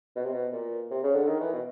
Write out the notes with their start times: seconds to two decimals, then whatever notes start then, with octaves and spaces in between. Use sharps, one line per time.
0.16 B2
0.24 C3
0.33 B2
0.53 A#2
0.91 C3
1.04 C#3
1.15 D3
1.27 D#3
1.41 E3
1.53 B2